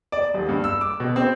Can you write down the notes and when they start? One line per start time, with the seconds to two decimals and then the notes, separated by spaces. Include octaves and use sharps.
0.12 D5
0.34 D#1
0.49 G2
0.64 E6
0.81 D6
1.00 B2
1.16 C4